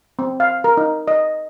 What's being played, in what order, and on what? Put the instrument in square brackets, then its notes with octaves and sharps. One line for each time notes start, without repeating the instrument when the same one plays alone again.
[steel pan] C4
F5
A#4
D#4
D#5